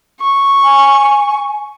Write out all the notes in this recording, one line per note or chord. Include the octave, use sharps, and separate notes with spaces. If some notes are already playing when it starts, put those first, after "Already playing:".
C#6
G#5